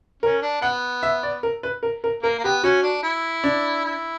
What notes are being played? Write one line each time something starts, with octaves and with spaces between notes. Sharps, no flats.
C#4 A#4
D4
B3 F#5
E5
D5
A#4
B4
A#4
A#4
A#3 A#4
A#3
B3 G4
C#4 F#4
D4
E4
D4
E4